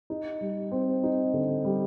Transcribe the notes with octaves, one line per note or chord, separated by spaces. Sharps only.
D#4
G3
C4
D#4
D3
G3